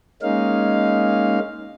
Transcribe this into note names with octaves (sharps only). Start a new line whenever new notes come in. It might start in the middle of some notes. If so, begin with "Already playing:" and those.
G#3 A#3 C#4 D#4 F5